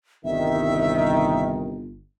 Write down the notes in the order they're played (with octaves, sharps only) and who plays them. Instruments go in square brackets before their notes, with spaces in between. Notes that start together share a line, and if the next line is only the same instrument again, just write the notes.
[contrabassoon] G1 [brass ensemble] C2 D#3 [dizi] E5